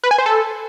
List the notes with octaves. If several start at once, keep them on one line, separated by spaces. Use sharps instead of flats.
B4
G#5
C5
A4